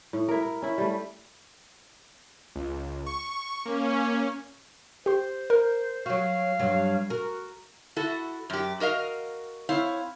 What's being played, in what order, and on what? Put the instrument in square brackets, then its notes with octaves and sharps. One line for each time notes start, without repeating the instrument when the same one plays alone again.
[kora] A2
E4 A#4
A#4
C#4 E4
G3 A3
[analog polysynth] C#2
C#6
[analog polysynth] A#3 [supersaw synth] C#4
[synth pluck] G4 C6 [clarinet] C5
[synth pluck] A#4
[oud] F#3 F#4 [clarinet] F5
[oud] G2 F#3
[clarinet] F#4 [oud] A#4
[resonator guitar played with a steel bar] E4 F#4 A4
F#2 G4
F#4 A#4 D#5 F5
C4 E4 C#5 F5